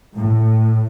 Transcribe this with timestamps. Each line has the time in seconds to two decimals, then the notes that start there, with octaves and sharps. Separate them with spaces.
0.15 A2